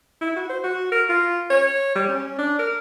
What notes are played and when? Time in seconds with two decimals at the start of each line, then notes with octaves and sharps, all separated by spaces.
0.21 E4
0.36 F#4
0.49 C5
0.64 F#4
0.92 A#4
1.09 F4
1.50 C#5
1.96 G3
2.09 C#4
2.39 D4
2.59 A#4